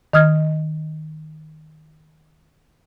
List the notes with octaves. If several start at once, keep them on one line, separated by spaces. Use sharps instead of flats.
D#3 D#5 D#6 F6 G#6